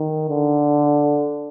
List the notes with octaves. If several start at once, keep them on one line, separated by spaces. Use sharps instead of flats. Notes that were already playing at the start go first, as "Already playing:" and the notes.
Already playing: D#3
D3